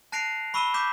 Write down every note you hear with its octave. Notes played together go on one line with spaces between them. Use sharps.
A5 F#6 A#6 C7 D7 F7
B5 C#6 E6 D#7 E7 G7
D6 G6 B6 E7